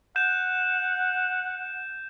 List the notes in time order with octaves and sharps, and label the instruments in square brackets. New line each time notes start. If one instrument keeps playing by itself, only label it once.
[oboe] F#5 [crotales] G6 E7